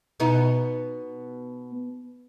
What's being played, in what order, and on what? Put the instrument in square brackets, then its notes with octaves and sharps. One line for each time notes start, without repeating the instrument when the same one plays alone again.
[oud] B2 B3 D#4